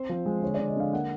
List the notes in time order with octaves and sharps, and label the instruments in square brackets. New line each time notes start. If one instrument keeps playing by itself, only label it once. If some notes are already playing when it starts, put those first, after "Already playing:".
Already playing: [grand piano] C4 C5
F3
G#3
D3 C#5
D3 D5
D#5
D3 F5
A#3 F#5